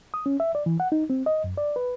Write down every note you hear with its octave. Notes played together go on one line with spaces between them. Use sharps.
D#6
C#4
E5
D5
E3
F#5
D#4
C4
D#5
F#2
D5
B4